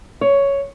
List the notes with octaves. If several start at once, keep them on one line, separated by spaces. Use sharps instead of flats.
C#5